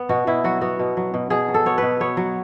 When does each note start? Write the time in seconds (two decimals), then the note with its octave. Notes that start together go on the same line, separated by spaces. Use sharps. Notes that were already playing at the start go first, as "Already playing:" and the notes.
Already playing: B3
0.09 B2 F#4
0.27 B2 E4
0.44 F#3 F#4
0.61 B3 F#4
0.79 B2
0.97 F#3
1.14 B2
1.30 B2 G#4
1.48 F#3
1.54 A4
1.66 B3 C#5
1.78 B2 B4
2.00 B3 C#5
2.17 F#3